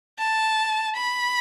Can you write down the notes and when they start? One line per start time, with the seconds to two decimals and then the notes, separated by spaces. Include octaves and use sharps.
0.19 A5
0.96 B5